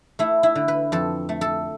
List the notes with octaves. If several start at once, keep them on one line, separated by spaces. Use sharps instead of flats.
A3 E4
E4
D3
B4
F2 A4
A3
A4